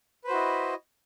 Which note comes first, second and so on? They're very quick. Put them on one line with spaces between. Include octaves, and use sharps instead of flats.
B4 C5 F#4 E4 D#5